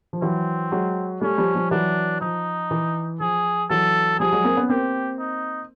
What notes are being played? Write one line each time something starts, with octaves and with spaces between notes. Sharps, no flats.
F3
E3 F#3 C4
F#3 G#3
G3 A3 C#4
F3 G3
F3 G3
E3 F#3 D4
F3 D#4
E3
F3 G#4
E3 F#3 A4
F3 G3 G#4
F#3 G#3
A#3 C4
B3 C#4
A#3 C4 G4
D#4